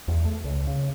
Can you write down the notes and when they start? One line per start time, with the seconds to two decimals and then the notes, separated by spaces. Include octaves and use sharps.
0.08 E2
0.25 A3
0.44 C#2
0.67 C#3